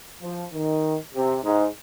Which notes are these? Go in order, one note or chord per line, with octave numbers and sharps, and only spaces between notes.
F3
D#3
C3
G#2